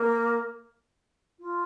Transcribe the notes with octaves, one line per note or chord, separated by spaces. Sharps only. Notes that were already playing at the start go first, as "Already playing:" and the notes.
Already playing: A#3
F4